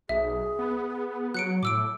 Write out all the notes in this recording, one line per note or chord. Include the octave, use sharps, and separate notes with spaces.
B1 G#4 E5
B3
F#3 F#6 C#7 D7
A2 D6 E6 D7